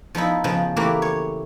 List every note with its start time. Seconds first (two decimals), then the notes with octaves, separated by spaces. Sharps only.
0.15 F3 B3 D#4 E4
0.44 C#3 F3 B3
0.76 E3 A3 A#3 E4 G4 A#4
1.02 C#5